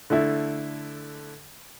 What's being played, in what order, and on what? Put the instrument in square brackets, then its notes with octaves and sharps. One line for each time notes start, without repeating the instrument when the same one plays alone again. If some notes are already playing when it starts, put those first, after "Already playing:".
[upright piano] D3 A3 E4